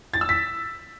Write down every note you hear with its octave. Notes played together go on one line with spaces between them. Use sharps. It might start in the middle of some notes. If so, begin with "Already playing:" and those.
A6
E6
B6